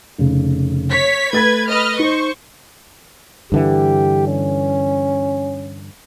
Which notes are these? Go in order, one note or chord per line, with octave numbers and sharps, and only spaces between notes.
F1 C#3
C#5 B6
A3 B4 G#6 A6 B6
B4 D#5 F6
D#4 C5 C#6
G2 D3 E3 G4
C#4